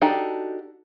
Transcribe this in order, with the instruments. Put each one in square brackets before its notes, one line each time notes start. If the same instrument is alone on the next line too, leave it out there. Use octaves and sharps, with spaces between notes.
[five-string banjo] D4 D#4 F#4 G4 A4